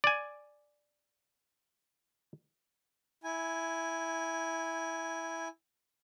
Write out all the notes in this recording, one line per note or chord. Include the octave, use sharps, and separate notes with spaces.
D5 G#5
E4 G#5